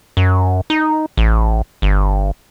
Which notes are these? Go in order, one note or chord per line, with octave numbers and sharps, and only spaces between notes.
F#2
D#4
A1
G1